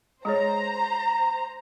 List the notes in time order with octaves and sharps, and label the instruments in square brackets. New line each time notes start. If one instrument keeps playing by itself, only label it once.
[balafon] G#3 G#4 C#5 [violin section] C5 A#5